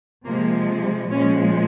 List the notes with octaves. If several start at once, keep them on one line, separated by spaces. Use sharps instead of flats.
C3 F3 G#3 A#3
A#2 F3 G#3 C#4